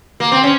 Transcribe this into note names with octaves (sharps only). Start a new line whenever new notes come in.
A#3
C4
C#4